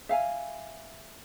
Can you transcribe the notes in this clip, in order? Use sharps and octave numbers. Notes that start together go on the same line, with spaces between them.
E5 F5 G#5